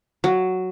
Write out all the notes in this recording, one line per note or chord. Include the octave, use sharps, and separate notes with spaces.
F#3